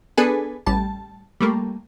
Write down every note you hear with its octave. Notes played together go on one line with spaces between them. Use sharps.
B3 D4 G#4 A4 B4 G#5
A1 G3 A5
G3 A3 A#3